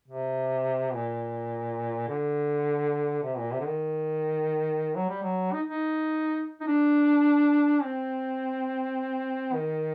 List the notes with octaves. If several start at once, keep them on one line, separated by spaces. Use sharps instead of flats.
C3
A#2
D3
C3
A#2
C3
D3
D#3
F#3
G3
F#3
D#4
D#4
D#4
D4
C4
D#3